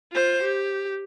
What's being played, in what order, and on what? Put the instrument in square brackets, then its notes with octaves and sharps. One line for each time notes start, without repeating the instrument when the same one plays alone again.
[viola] F4 C5
G4